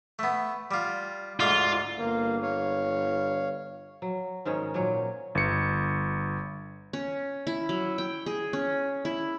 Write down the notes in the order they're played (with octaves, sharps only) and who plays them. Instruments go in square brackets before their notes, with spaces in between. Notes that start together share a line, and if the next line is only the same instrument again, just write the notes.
[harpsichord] A3 B3
G3 F4
[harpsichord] D2 G#2 F5 [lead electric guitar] F4
[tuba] G1 [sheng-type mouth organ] A#3
[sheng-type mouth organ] C#5 F5
[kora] F#3
G#2 D#3 C#4 C#5
A#2 F#3 C#4 C#5
[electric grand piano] G1 C#7
[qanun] C#4
E4
F#3
G5
G#4
C#4
E4